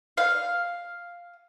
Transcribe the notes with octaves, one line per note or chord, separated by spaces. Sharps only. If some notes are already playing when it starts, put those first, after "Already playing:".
F5